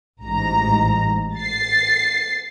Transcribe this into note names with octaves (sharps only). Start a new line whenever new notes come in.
A1 G#2 A#5
A6 C7